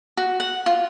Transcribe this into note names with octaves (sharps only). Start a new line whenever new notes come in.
F#4
F#5
F4